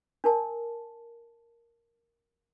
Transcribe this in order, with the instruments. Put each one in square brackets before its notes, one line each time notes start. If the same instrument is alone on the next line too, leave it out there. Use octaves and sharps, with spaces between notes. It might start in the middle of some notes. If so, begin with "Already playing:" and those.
[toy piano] D4 A#4 A5